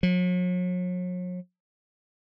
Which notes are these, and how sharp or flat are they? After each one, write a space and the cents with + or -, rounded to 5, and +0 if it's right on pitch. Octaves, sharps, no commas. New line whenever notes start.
F#3 -40